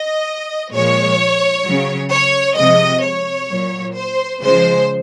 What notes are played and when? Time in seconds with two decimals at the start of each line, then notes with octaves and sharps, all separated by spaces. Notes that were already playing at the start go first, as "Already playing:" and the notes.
Already playing: D#5
0.72 A#2 F3 G#3 C#5
1.65 C#3 F#3
2.11 C#5
2.57 C3 F3 G#3 D#5
3.04 C#5
3.49 A#2 F#3
3.95 C5
4.42 C#3 F3 G#3 C5